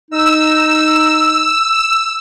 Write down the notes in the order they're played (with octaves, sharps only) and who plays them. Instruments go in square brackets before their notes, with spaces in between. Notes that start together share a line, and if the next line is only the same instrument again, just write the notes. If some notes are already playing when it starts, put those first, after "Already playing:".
[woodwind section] D#4 [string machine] E6